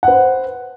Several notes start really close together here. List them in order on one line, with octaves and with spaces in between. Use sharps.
F#5 B4 C5